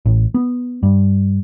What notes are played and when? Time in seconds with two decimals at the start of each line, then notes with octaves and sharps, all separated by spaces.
0.06 A1
0.34 B3
0.83 G2